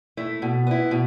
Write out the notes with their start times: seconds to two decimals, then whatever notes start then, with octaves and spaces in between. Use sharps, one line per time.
0.17 A3 E4
0.42 B2
0.67 B3 E4
0.91 B2